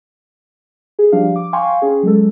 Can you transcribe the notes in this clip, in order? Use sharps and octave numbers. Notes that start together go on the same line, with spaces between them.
G#4
F3 G3 D4 F5
D6
F5 G5 G#5 C6 C#6
C#4 G#4
F#3 G#3 A4